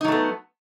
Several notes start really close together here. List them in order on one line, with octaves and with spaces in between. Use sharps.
D#4 F#3 A3 B3